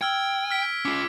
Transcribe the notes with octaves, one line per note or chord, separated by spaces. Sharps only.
G5 E6 F6 G#6
F6 B6 D7
C#4 F4 D6 B6